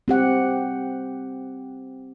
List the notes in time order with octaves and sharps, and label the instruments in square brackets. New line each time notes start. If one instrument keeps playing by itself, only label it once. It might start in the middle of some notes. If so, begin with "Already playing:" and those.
[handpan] C4 G4 F#5